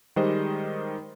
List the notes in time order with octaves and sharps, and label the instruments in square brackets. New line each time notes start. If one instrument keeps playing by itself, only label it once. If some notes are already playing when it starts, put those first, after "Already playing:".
[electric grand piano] D#3 G3 G#3 G4 C5 D#5